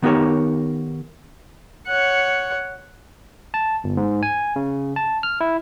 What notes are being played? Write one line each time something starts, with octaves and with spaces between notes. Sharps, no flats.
D#3 B3 D#4 G4 A#4 C#5
C#5 F#5
A5
G1
G#2
G#5
C#3
A5
F6
E4